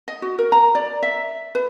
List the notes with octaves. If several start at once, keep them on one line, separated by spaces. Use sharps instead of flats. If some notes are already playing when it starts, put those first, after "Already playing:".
D#5
F#4
A#4
A#5
D5
E5
B4